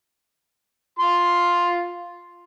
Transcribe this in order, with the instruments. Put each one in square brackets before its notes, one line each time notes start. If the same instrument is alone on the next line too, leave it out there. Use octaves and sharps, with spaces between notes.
[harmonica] F4 C6